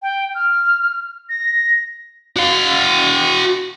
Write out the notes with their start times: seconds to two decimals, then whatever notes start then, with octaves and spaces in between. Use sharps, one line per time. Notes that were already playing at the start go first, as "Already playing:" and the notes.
0.02 G5
0.35 F6
1.29 A#6
2.37 F#4 F5